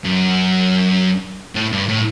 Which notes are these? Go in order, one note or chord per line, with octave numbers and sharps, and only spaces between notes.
F#2
A2
G2
A2